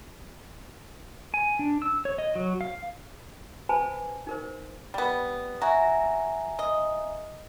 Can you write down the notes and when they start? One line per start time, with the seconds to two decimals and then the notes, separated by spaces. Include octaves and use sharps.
1.34 G#5
1.59 D4
1.82 E6
2.05 C#5
2.18 D#5
2.35 F#3
2.61 F5
3.69 B4 C5 G#5 A5 B5
4.27 D#4 A#4 C5
4.94 G3 B3
5.62 F#4 E5 G#5 A#5
6.59 D#5